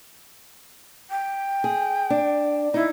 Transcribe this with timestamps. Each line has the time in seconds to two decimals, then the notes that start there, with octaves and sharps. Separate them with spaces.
1.11 G5
1.64 G#4
2.10 D4
2.74 D#4 E4